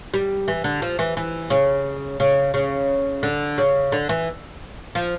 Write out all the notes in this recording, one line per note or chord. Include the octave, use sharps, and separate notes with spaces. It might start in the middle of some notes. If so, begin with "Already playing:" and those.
G3
E3
D3
F3
E3
E3
C#3
C#3
C#3
D3
C#3
D3
E3
F3